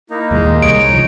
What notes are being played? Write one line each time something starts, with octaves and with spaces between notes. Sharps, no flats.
A#3 D#4 E4
D#2 A#2 G3 G#3
C2 D#4 C#5 D7
C#3 F3